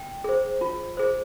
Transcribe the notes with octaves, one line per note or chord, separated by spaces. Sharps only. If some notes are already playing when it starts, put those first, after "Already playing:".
Already playing: G5
G#4 C5
F4
G#4 C5